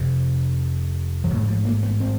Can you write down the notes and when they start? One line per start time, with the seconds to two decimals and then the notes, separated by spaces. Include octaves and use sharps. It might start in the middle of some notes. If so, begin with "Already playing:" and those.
Already playing: F1 F2 C3
1.24 F3
1.31 A1 G#2 F#3
1.48 F3
1.65 A#3
1.83 B3
2.00 C4